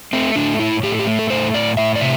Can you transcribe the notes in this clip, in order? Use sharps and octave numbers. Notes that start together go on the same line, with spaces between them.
A3 C4
A2 D4
A2 E4
A2 G4
A4
G4
A3
A4
A2 C5
A2 D5
A2 E5
D5
C3 E5